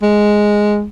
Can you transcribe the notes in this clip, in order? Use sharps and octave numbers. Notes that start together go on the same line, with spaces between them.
G#3